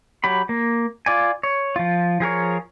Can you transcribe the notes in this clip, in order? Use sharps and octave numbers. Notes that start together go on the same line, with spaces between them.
F#3 G4 B5
A#3
F4 D5 G#5
C#5
F3 F4
F3 G#4 A#4 C#5